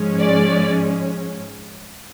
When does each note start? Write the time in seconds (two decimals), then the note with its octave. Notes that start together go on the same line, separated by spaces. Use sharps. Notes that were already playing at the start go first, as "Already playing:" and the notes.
Already playing: G#2 F3 G#3 C#4
0.20 D5